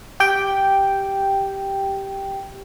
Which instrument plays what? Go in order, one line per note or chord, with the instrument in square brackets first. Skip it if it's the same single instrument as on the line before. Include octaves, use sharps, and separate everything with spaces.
[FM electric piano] G4 G5